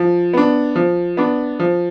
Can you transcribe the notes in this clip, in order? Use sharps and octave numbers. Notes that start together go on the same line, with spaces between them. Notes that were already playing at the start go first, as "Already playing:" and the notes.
Already playing: F3
B3 D4
F3
B3 D4
F3